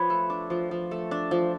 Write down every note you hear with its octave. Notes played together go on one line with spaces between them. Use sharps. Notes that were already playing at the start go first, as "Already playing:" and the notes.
Already playing: F3 B4 C#5
A3
D4
F3
F3
A3
D4
F3